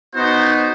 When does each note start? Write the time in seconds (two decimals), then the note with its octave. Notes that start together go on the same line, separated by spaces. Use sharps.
0.15 B3 D#4 F#4 C5